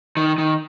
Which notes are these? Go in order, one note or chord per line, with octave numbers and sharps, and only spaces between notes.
D#3
D#3